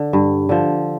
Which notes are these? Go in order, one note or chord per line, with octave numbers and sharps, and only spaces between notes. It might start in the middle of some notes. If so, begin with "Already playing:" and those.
Already playing: D3
G2
D3 F3